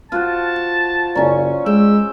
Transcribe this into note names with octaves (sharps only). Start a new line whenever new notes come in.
F4 F#4 C5 A5 F6 F#6
A6
F#1 C#4 D5 A#5 C#6
G#3 G5 E6